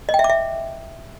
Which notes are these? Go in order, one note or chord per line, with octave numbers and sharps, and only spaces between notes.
D#5
G5
E5
D6
E5